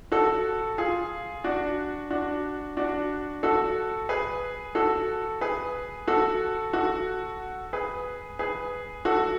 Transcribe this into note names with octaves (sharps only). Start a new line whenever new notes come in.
F#4 A4
F4 G#4
D4 F#4
D4 F#4
D4 F#4
F#4 A4
G#4 B4
F#4 A4
G#4 B4
F#4 A4
F#4 A4
G#4 B4
G#4 B4
F#4 A4